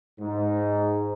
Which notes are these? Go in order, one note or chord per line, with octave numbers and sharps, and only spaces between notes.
G#2 D#4